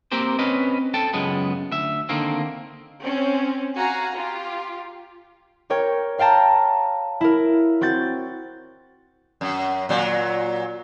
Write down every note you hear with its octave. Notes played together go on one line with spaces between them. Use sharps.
A#3 C4 G4 A#4 C5
C4 C#4 B4 D#5
A4 G5 A5
C#2 F#2 G#3 B3
D2 E5
D3 D#3 A#3 C4
C4 C#4
F#4 F5 G#5 A#5
F4 G4
G4 A#4 C#5 G5
C#5 F5 G5 A5 A#5
E4 A#4
C4 F#4 G6 A6
F#2
A#2 F#3